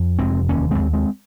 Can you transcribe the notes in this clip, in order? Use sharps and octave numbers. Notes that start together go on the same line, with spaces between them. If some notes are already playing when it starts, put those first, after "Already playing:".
Already playing: F2
F1 G#3 C4
D#2 A#3 C#4
G#3 C4
D#2
G#3 C4